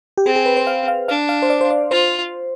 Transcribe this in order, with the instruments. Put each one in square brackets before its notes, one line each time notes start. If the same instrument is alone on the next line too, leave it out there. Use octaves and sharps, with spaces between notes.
[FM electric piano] G4
[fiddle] C4 [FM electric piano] G#4
[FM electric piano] G#4
B4
C5
F5
F5
[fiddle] D4 [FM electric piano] F5
[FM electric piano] F5
C5
D5
C5
D5
[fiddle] F4 [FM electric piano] C5